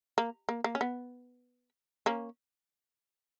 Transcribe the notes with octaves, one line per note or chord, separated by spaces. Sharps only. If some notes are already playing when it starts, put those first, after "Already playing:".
A#3
A#3
A#3
C#4
B3
A#3 C#4